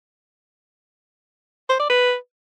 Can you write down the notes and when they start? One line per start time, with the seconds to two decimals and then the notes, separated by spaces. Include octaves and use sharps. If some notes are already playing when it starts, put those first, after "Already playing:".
1.69 C5
1.80 D5
1.90 B4